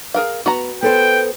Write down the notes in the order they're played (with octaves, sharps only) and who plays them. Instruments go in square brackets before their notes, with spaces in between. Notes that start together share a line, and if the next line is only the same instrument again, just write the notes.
[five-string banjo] G#4 A#4 F5
[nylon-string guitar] B3 [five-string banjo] F#4 A#5
[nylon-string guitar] B3 A4 C5 [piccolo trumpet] G5